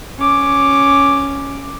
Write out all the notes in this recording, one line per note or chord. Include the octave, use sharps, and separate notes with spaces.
C#4 D6